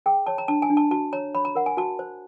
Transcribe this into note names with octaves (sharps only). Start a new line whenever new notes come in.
G#4 G5
C#5 A5
A#5
D4 A5
G#5
D4
A5
F#4 A5
C#5 A#5
C#5 B5
A#5
A#4 F#5
G#5
F#4 A5
C5